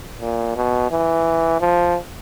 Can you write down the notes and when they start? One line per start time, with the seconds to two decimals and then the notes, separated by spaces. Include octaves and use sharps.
0.21 A#2
0.56 B2
0.91 E3
1.61 F3